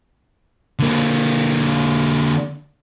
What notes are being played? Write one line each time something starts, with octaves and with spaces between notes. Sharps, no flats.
D3 A#3